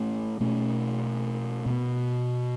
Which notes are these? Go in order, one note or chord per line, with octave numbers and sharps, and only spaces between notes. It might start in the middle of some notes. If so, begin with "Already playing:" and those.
Already playing: A2 A3 C#4
B2 A3 C#4
B2 B3